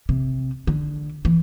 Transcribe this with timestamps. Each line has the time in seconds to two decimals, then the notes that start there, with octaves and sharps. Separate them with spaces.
0.09 C3
0.67 D3
1.25 E3